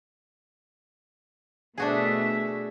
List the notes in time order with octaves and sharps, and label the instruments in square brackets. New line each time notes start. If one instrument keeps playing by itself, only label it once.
[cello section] B2 A3 E5 [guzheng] D4 F#4 G#4